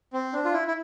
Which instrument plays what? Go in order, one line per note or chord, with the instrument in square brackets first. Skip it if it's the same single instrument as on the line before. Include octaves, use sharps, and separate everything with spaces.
[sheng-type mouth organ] C4
D4
F4
E4
E4